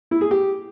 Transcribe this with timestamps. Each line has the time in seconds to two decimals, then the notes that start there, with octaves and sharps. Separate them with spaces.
0.11 E4
0.21 G#4
0.31 G4